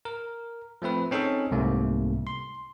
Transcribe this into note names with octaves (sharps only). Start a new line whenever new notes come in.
A#4
F3 A3 C4 B4
C4 C#4 D#4 G#4 A4
C2 G#2 C3 A3 A#3
C6